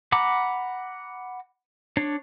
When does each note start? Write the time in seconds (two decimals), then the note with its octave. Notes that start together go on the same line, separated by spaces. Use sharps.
0.12 F#5 A#5 B5 D6
1.97 D4 C#5